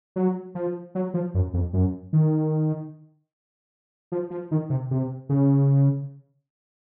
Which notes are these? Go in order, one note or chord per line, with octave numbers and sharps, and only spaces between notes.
F#3
F3
F#3
F3
F#2
F2
F#2
D#3
F3
F3
D#3
C3
C3
C#3